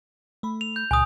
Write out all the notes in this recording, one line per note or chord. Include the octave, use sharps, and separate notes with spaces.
A3 B5
F7
G6
C#2 A#2 G#5 D#6 F#6